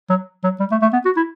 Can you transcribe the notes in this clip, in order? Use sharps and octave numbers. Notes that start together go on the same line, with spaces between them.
F#3
F#3
G3
A3
A3
B3
F#4
E4